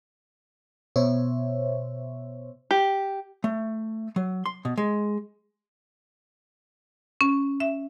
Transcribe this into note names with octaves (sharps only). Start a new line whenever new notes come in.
B2 C5 C#5 E5
G4
A3
F#3
C6
B2
G#3
C#4
E5